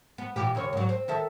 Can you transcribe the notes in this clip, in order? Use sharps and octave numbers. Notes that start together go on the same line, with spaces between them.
B3
A#2 E3 G4
D#2 C#3 C#5
G#2 F#3
C4
D#3 A4 E5